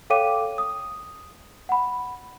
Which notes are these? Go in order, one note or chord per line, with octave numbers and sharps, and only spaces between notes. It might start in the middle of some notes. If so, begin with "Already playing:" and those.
A4 C#5 F5 G5 D6 D#7
D#6
F#5 B5